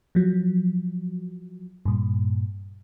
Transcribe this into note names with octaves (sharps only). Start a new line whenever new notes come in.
F3 F#3
G2 A#2